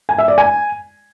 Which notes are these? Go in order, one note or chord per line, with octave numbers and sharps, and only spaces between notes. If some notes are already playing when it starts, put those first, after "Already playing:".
G#5
E5
D5
G#5